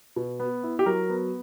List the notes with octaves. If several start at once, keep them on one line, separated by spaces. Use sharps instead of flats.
B2
B3
E4
G4
F#3 A#4
B3